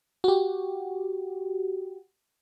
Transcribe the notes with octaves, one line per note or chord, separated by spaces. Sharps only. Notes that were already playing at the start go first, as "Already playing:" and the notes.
F#4 G4